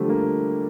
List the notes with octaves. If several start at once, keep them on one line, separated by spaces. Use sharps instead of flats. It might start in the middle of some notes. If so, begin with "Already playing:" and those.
Already playing: D3 F3 G3 A3
A#3